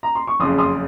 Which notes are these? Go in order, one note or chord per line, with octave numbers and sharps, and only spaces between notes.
A#5
C6
C#6
F#1 F2 C#3 C6 D#6
C6 D#6